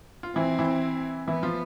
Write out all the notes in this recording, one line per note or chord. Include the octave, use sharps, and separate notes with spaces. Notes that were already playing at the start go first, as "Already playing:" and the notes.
F4
E3 C4 E4
E3 E4
E3 B3 E4
F3 F4